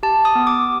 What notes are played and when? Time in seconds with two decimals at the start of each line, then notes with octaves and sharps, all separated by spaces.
0.03 G4 A5
0.25 D#6
0.35 B3
0.47 D6